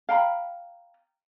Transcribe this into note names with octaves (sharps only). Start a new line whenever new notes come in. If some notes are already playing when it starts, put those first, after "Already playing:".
F5 G5 A#5 B5